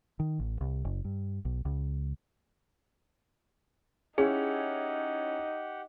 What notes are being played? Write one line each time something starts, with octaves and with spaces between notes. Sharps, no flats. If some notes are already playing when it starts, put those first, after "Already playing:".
D#3
A1
C2
F#1
G2
B1
C#2
C#4 D#4 E4 G4 G#4 F#5